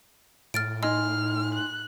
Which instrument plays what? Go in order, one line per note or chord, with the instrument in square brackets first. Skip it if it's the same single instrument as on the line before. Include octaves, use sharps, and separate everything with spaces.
[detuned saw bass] A2 [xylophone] F6 A6 D7
[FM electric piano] D#4 G#5 C6 [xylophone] D#5 [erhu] F6
[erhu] F#6